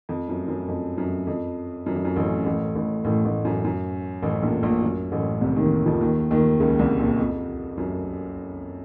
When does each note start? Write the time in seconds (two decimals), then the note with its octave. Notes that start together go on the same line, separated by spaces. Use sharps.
0.09 F2
0.29 F#2
0.48 F#2
0.68 F2
0.98 F#2
1.27 F2
1.86 F#2
1.95 F2
2.05 F#2
2.15 A1 A2
2.45 A1 A2
2.75 A1 A2
3.04 A1 A2
3.25 A1 A2
3.45 F#2
3.64 F#2
4.23 A1 A2
4.43 A#1 A#2
4.62 A#1 A#2
4.82 F#2
5.12 A1 A2
5.41 C2 C3
5.56 D#2 D#3
5.86 F2 F3
6.00 D#2 D#3
6.31 D#2 D#3
6.60 C#2 C#3
6.79 C2 C3
6.99 A#1 A#2
7.19 F2
7.77 F#2